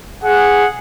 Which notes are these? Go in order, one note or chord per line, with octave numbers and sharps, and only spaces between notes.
G#4 F#5